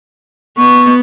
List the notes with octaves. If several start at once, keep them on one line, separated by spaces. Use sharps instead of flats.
B3 C#6